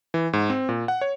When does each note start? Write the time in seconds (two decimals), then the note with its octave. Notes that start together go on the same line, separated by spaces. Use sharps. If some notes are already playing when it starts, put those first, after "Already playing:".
0.14 E3
0.33 G#2
0.50 C4
0.69 A#2
0.88 F#5
1.01 C#5